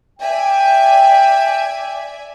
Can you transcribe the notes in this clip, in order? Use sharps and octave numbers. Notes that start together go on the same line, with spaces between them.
D5 E5 G5 G#5